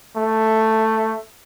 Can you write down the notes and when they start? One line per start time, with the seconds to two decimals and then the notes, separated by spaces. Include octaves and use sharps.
0.16 A3